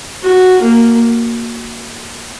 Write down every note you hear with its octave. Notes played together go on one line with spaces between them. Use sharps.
F#4
A#3